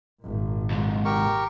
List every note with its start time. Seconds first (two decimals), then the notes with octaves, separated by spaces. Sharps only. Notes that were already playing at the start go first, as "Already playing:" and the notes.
0.21 G#1 A#2
0.71 D#2 G#2
1.05 G4 A#4 C#6